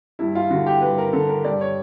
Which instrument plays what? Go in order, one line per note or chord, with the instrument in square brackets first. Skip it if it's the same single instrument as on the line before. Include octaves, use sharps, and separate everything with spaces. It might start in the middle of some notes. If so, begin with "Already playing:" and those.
[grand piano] G2 E4
F4
D3 F#4
G4
G2 B4
A#4
D3 A4
A#4
G2 D5
C#5